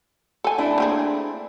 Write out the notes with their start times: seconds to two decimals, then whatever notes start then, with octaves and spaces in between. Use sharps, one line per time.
0.44 A4 G#5
0.58 A3 D4 E4
0.78 A#3 C4 G#4